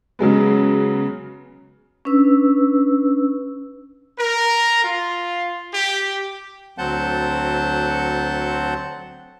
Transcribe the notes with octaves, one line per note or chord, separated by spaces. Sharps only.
C#3 F#3 G#3 B3
C#4 D4 B4 E6
A#4
F4
G4
D2 F#3 C4 F#5 A5 G6